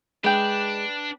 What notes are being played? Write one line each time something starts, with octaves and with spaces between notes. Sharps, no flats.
G#3 D4 B4 G5